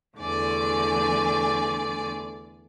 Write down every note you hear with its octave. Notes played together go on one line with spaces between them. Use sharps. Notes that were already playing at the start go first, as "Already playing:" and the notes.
E2 D3 A3 D5 G#5